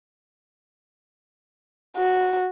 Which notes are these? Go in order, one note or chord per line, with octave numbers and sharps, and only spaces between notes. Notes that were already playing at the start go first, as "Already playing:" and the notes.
F#4